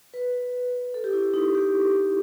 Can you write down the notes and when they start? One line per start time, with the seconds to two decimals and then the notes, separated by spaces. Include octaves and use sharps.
0.14 B4
0.94 A4
1.04 G4
1.13 E4
1.34 D#4
1.55 G4